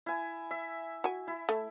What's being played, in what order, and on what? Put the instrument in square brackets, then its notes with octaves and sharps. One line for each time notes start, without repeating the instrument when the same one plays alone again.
[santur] E4 G#5
E5
[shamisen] F#4 G#5
[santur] E4
[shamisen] A3